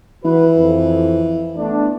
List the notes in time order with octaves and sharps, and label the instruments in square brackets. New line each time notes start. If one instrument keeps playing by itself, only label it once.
[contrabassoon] E3 [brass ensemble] F#4 B4
[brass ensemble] F2
A3 B3 D4